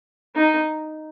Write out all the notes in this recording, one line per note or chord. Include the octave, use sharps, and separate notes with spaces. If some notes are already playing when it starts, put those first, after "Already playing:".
D#4